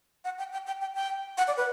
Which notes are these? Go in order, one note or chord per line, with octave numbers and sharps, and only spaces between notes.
F#5
G5
G5
G5
G5
G5
F#5
D5
B4